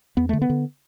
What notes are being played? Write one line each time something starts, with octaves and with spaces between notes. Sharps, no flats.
E2 B3
D3 A3
B3
D3